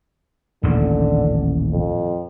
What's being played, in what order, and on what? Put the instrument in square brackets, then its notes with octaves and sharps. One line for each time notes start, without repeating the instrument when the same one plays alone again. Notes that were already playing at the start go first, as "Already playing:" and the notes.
[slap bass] D#1 A1 [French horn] D3
[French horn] F2